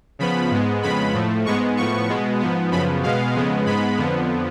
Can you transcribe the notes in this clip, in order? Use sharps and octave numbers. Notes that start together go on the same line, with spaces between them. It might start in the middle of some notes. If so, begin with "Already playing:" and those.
C#3 F3 B3 B5
G#2 G#3 B3
F2 C#3 G#3 B3 B5
A2 F3 A3
G#2 G#3 B3 C#6
A2 F3 B3 C#6
B2 G#3 B3
G#2 F3 B3
F#2 C#3 F3 B3 B5
B2 G#3 B3 F5
F2 C#3 G#3 B3
G#2 G#3 B3 B5
F2 D3 F3 B3